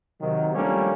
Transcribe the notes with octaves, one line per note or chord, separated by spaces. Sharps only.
C3 D#3 F#3
F3 G3 A3 A#3 C#4 D4